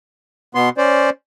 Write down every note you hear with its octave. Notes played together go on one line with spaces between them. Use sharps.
B2 B3 C6
C#4 C5 D5